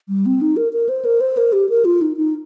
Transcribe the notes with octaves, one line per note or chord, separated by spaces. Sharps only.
G3
C4
D#4
A#4
A#4
C5
A#4
C5
A#4
G4
A#4
F4
D#4
D#4